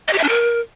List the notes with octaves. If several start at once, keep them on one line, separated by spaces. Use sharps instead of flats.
D#5
G4
E5
D4
A#4